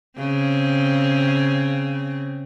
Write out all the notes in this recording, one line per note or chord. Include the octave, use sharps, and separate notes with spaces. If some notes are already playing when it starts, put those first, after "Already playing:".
C#3 C4